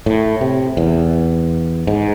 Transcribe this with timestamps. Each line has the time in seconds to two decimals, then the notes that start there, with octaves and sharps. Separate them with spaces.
0.06 A2
0.41 C3
0.77 E2
1.87 G#2